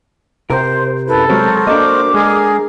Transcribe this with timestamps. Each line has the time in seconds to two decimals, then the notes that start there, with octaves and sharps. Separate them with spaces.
0.50 C3 A#4 C5
1.08 F#2 E4 A4 B4
1.30 F#3 G#3 C4 F#4 A#4 C5
1.67 A#3 D4 A4 D#5 D6
2.14 G#3 G#4 A#4 G#5